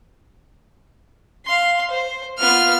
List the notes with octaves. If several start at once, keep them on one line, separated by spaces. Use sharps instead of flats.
F5 C6
C5
B3 F4 F6